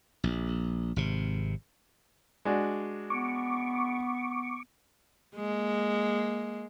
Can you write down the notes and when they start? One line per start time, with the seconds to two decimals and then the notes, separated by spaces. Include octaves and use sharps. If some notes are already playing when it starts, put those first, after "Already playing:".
0.24 A#1
0.96 G#1 C3
2.45 G#3 D4 F#4
3.10 B3 C#6 D6
5.36 G#3 A#3